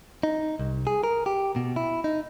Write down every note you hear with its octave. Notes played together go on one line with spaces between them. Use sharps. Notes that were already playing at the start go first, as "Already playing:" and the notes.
D#4
C2
G#4
A#4
G4
B2
E4
D#4